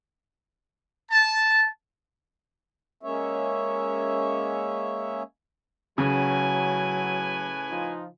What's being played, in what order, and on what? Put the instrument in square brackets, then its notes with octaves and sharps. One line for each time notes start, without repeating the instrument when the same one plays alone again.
[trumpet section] A5
[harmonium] G#3 A#3 C#4 C#5 E5
[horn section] A2 B4 G#5 [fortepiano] C#3 [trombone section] F#3
[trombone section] F3 D#4 F4